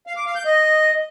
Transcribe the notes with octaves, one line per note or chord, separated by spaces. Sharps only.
F5
D6
F5
G6
D#5